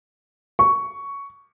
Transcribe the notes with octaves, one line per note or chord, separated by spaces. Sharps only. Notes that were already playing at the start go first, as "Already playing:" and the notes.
C#6